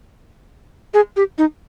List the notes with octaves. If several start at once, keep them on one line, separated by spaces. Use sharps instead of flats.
G#4
G4
D#4